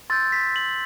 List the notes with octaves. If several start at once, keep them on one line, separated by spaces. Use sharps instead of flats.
C6 E6 G6 A6
B6
F#7